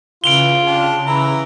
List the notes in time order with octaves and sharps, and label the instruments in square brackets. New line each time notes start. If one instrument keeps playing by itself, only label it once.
[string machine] C#3 [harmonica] E3 [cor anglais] F4 [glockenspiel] D7 F7 G7
[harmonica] D4 G4
[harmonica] E3 A#5 [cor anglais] E4